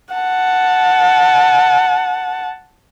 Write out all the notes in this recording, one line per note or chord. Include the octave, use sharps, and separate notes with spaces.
F#5 A5